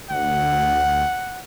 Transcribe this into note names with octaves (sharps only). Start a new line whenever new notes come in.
D2 F#5